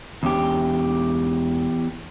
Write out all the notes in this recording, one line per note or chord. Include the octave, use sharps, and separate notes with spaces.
E1 E2 C#4 D4 G4